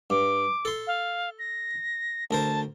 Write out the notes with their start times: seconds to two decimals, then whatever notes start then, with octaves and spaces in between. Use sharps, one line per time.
0.10 G2 D6
0.65 A4 C6
0.87 F5
1.39 A#6
2.31 D2 A#4 C5 A5